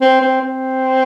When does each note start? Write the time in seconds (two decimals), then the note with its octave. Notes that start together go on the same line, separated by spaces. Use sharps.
0.01 C4
0.22 C4
0.42 C4